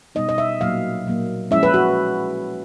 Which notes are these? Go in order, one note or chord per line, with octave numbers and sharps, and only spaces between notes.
B2 G3 B3 D#4 D#5
D#5
E5
A#2 F#3 A#3 F5
A#2 F#3 A#3
F3 G#3 C#4 E4 E5
B4
F#4